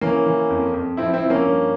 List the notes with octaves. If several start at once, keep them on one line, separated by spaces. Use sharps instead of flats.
E3 A#3 C#4
E3
F2
F2
F3 C4 E4
C4 E4
F3
A#3 C#4
G2